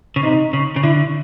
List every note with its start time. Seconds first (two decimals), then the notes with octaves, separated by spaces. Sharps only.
0.16 C#3
0.23 C3 D#4
0.53 C#3
0.76 C#3
0.83 D3 E4